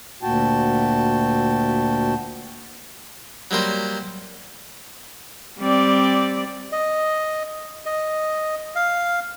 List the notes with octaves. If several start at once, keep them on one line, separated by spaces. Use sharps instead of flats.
D2 A#2 F#4 G5 A5
F#3 G3 A#3 C5
G3 C4 D5
D#5
D#5
F5